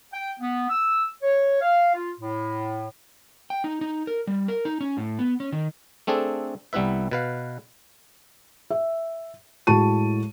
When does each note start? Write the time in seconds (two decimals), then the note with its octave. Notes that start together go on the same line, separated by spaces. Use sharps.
0.13 G5
0.40 B3
0.70 E6
1.23 C#5
1.61 F5
1.95 F4
2.20 A2
3.50 G5
3.64 D#4
3.81 D#4
4.07 A#4
4.27 G3
4.48 A#4
4.65 D#4
4.81 C#4
4.97 A2
5.19 B3
5.40 C#4
5.52 D#3
6.07 A3 C4 D4 G#4 A4
6.73 C2 G3 B3 E4 B4 E5
7.11 B2 B4 F5
8.70 E5
9.67 A2 G#3 F#4 A5 C#6 D#7